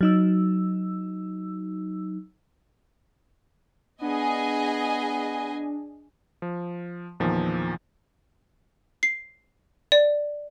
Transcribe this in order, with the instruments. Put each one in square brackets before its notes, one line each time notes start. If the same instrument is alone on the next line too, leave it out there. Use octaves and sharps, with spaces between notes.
[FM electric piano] F#3 D#4 E6
[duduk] B3 [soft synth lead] D4 [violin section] G#4 D#5 G#5
[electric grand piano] F3
E2 A#2 D#3 F3
[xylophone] C7
D5